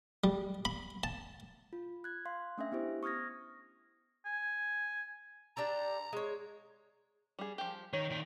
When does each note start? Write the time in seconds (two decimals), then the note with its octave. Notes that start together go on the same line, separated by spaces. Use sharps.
0.24 G3
0.65 B5
1.04 A5
1.73 F4
2.04 F#6 G#6
2.26 F5 C6
2.58 A3 C#4 D4 E5
2.72 B3 E4 G4 C5
3.03 C#6 D#6 F6 G#6 A#6
4.25 G#5
5.57 D4 G4 A4 A#5
6.13 G#3 C#5
7.39 G3 G#4
7.58 F3 G4
7.93 D#3 C#5
8.10 A#2 D#3